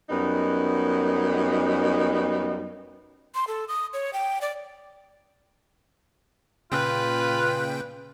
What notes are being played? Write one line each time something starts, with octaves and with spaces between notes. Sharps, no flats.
F#2 G3 B3 D#4
C6
A4
D#6
C#5
G5
D5
A#2 C#3 F4 B4 G5